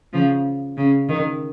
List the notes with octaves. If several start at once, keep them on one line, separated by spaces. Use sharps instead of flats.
C#3 F3
C#3
D#3